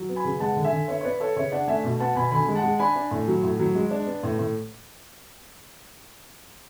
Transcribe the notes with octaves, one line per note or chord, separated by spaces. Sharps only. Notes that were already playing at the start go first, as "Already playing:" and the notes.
Already playing: F#3
B3
G#5 B5
C#3
G#3 F#5 A5
D3
E5 G#5
D3
B3 C#5 E5
C#5
B3 B4 D5
B3 A4 C#5
C#3 C#5 E5
D4 D5 F#5
A3 E5 G#5
B2
B3 F#5 A5
B2 G#5 B5
D3 G#5 B5
G#3
F#5 A5
G#3
D4 G#5 B5
D4
A2
F#3
A2
F#3
G#3
D4
B3
A2
A2